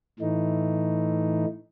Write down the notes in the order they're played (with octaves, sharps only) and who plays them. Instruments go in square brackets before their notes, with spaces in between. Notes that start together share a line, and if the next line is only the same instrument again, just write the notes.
[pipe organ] A2 E3 A3 D#4